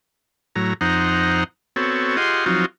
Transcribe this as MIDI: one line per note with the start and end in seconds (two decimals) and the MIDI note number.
0.56 0.73 45
0.56 0.73 54
0.56 0.73 82
0.81 1.44 41
0.81 1.44 63
0.81 1.44 72
0.81 1.44 78
0.81 1.44 82
1.76 2.17 59
1.76 2.17 60
1.76 2.17 66
1.76 2.17 69
1.76 2.17 73
2.17 2.45 65
2.17 2.45 67
2.17 2.45 68
2.17 2.45 75
2.17 2.45 78
2.17 2.45 84
2.46 2.66 53
2.46 2.66 54
2.46 2.66 60
2.46 2.66 63
2.46 2.66 65
2.46 2.66 66